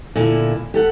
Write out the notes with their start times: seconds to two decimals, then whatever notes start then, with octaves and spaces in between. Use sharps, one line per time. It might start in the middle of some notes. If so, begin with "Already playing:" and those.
0.16 A#2 D3 E4
0.74 G4 A4 F#5